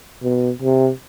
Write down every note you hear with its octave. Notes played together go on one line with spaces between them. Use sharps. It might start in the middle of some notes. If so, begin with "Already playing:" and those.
B2
C3